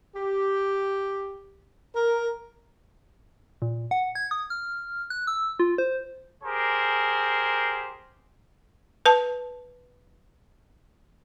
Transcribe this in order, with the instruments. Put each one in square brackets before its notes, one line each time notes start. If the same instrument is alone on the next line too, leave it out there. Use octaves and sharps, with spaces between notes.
[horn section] G4
A#4
[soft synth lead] A#2
F#5
G#6
D#6
F6
F#6
E6
F4
C5
[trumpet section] G4 G#4 A#4 C5
[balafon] B4 A5